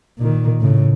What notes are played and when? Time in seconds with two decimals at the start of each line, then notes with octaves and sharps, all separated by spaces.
0.19 A#2 D#3
0.61 A2 C#3